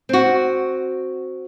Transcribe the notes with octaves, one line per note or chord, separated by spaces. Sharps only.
C4 F#4